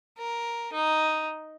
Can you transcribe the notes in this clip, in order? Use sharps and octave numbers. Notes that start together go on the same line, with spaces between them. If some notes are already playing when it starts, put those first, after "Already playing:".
A#4
D#4